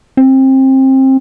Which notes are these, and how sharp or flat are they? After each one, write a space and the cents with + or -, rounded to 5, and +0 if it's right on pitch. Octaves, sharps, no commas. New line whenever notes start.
C4 +25